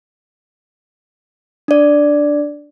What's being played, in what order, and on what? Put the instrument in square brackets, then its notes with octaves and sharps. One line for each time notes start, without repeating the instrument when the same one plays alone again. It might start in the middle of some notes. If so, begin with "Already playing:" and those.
[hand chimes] D4 D5